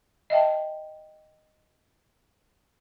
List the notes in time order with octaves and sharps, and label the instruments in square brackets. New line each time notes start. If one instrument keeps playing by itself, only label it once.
[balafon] D#5 E5 G5 A5